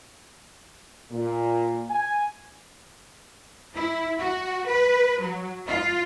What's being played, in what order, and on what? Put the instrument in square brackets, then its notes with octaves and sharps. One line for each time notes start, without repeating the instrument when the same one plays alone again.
[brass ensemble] A#2
G#5
[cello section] E4
F#4
B4
F#3
F4